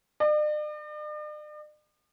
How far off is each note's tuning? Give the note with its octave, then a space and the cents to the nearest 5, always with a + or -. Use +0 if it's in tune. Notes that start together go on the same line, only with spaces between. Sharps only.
D5 +45